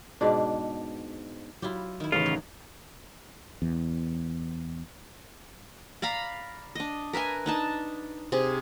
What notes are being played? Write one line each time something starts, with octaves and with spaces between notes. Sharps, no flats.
G#2 B2 D4
F#3 E4 F4 G4
D#3 E4
A1 C#3 F4
F#3
E2
D5 F5 A#5 B5
D4 D#5
A#4 B4 E5 G#5
D4 D#4 A5
C3 G#4